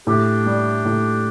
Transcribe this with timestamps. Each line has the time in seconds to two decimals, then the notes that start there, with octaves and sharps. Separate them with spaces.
0.07 A2 D4 G4
0.46 G3
0.85 A2